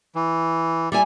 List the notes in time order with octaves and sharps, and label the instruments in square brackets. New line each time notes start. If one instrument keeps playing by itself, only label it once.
[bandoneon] E3
[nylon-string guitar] G3 E4 G#5 [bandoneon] D5